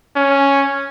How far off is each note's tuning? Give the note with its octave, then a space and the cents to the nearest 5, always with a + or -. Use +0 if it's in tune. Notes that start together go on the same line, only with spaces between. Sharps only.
C#4 +0